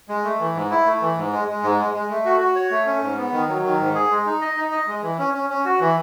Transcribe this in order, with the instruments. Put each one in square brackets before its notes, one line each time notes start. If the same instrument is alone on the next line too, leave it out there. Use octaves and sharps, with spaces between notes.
[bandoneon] G#3
A3
E3
G#2
E4
A3
E3
G#2
G#3
G#3
G#2
G#3
G#3
A3
F#4
F#4
C#5
A3
C#4
G#2
B3
D#3
F#3
D#3
G#2
G#4
G#3
D#4
D#5
D#4
D#5
G#3
E3
C#4
C#4
C#4
F#4
E3